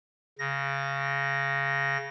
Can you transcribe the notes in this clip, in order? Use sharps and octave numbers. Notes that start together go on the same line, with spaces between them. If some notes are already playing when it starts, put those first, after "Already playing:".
C#3 A#6